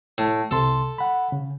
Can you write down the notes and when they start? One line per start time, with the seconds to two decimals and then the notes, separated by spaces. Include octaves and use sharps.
0.18 A2
0.51 C2 C3 A4 C6
0.98 F#5 B5
1.32 C#3